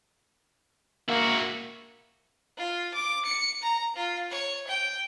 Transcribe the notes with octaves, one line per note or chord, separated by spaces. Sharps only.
A#3 E4 F#4
F4
D6
C#7
A#5
F4
C#5
G5